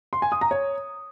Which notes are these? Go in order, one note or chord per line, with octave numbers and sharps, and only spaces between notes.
C6
G#5
D#6
A#5
C#5